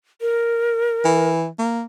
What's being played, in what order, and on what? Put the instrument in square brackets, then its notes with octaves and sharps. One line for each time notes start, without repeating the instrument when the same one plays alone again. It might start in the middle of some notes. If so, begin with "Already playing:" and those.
[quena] A#4
[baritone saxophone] E3
A#3